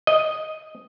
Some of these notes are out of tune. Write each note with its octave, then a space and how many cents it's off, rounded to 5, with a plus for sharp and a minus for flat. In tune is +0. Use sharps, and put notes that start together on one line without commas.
D#5 +0